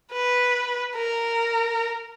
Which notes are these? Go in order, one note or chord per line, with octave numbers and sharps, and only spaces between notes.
B4
A#4